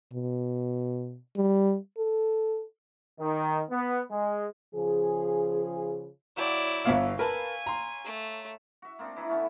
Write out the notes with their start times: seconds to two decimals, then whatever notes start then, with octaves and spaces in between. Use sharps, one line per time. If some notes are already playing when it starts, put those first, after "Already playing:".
0.13 B2
1.36 G3
1.98 A4
3.19 D#3
3.69 B3
4.10 G#3
4.75 C#3 F3 G#4
6.37 F#3 E4 D5 G5 G#5
6.85 G1 B3 C#5 E5 F5 E6
7.19 A#4 B4 G#5 A5 B5
7.66 A#5 C6
8.05 A3
8.82 F#4 E5
8.99 A#3 C4 D4 D#5
9.16 E3 D#4 E4 B4
9.29 D3 A3 B3 C#4